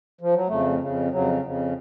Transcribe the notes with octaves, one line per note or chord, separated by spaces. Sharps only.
F3
F#3
F2 C#3 A3
F2 C#3
F2 C#3 F#3
F2 C#3